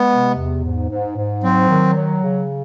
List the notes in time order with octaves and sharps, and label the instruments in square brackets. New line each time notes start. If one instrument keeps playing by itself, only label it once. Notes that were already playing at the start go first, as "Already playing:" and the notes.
Already playing: [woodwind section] G#3 [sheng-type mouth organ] B3
[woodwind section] C3
E2
G#2
G#2
G#2
[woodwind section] F#3 [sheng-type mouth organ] C4
[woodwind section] D#3
F#3
C#3